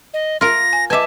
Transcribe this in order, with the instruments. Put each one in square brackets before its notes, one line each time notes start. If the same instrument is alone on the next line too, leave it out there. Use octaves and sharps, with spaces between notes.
[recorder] D#5
[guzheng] F4 A#4 [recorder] A#6
[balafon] G#5
[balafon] B4 D#5 D6 [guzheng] E5 G#5 [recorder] A5